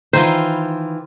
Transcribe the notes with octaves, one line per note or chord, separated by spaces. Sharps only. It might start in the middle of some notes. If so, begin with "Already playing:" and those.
D#3 E3 F4 C5